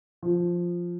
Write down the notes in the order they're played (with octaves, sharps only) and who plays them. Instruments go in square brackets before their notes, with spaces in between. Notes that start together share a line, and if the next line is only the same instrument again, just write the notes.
[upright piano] F3